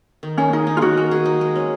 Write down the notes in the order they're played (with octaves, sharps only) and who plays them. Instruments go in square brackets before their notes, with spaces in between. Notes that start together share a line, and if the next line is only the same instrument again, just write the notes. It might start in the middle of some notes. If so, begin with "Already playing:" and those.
[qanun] D#3
[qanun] A#3 [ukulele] C#4
[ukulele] D#4 [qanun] G#4
[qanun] D#4
[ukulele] F4
[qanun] D#3 [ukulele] F#4
[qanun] A#3
G#4
D#4
G#3
C#4